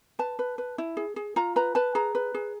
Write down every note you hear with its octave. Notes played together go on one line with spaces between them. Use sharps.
B4 A5
B4
B4
E4
G#4
G#4
F4 A#5
B4 A#5
B4 A5
G#4 A#5
B4
G#4